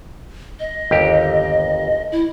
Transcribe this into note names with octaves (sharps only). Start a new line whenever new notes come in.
D#5
G1 D#2 G4
E4